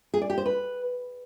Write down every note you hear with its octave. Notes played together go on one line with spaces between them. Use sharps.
G#4
D5
G4
C5
B4